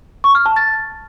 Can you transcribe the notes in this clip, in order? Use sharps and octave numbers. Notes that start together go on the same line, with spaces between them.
C#6
F6
A5
A6